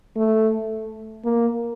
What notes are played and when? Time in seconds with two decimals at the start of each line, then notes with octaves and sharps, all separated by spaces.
0.16 A3
1.25 A#3